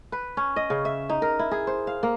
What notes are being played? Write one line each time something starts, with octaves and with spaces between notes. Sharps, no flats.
B4
C#4
D#5
C#3
E5
D#4
A#4
E4
G#4
C5
F5
A#3